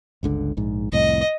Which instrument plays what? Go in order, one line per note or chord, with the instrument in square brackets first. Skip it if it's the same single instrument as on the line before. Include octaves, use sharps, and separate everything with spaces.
[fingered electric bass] G1 C#2 D3
A#1 G#2
[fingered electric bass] C2 F2 A2 [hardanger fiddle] D#5